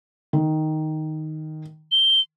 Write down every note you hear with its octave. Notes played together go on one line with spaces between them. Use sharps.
D#3
G7